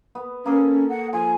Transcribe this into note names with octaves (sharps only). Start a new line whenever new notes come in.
B3
A#3 C#4 G#4 A4
F#5
F3 G#5